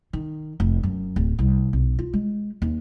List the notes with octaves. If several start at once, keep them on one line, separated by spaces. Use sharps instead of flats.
D#3
F1
F#2
D1
C2
B1
F4
G#3
D#2